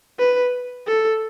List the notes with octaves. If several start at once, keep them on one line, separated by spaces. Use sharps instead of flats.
B4
A4